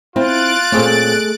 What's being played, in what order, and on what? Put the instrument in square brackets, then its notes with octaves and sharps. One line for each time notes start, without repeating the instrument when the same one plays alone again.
[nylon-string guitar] C4 [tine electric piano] E4 [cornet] F4 [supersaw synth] F#6 A6 D7
[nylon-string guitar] A#2 C4 C#5 [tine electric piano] A3 G#4 A4